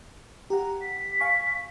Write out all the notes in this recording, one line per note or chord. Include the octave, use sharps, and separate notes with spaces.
G4 F#5 A#5
B6
F5 G#5 C#6